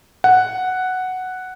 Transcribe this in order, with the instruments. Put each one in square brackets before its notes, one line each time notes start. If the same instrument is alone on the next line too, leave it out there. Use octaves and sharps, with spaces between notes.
[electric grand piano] F#5